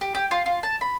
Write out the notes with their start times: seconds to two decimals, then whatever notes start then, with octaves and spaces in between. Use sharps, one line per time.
0.01 G4
0.15 G4
0.31 F4
0.46 F4
0.63 A5
0.81 B5